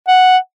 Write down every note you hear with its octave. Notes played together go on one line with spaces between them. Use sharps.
F#5